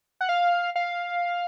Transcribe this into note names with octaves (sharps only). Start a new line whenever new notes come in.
F#5
F5
F5